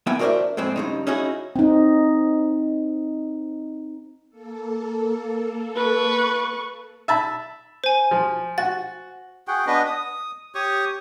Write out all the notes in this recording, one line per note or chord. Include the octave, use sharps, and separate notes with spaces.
A#3 B3 E4 G5 G#5
D4 F#4 A#4 C5 D5 E5
F2 A2 G#3 C4
G2 C#3 D#4
C#4 D#4 E4 F#4 G#4
C4 D#4
A#3 A4
B4 C#6
E5 A5 B5
C5 G#5
F3
F#4 A6
F#4 G#4 F#5 G5
B3 D4 B4 D#5
D#6
G4 C#5 C#6 D#6